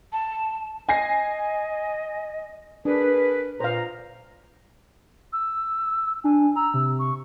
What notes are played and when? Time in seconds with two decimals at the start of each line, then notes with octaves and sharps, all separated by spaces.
0.13 A5
0.89 D#5 G#5 A#6 C7
2.85 D4 G#4 A#4 B4
3.60 A#2 B4 C5 F5 A#5
5.33 E6
6.24 D4 G#5
6.56 A#5 E6
6.74 C3
6.99 C#6